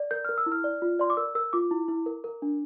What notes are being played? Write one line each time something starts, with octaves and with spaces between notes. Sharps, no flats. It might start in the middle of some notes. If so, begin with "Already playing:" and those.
Already playing: D5
A#4 G6
A#4 F6
E6
E4
F6
D5
F4
D5 C6
D6
A#4 E6
A#4 E6
F4 D6
E4
E4
A#4
A#4
D4